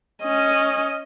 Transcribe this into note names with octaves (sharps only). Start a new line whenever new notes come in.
C#4 D#5